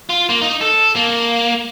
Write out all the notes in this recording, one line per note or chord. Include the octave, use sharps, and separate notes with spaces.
F4
A#3
D#4
A4
A#3